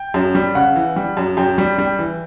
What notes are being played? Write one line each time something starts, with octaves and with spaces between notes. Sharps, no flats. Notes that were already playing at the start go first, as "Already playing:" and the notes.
Already playing: G5
F#2
G3
C#3 F#5
E3
G3
F#2
F#2 G5
G3
G3
E3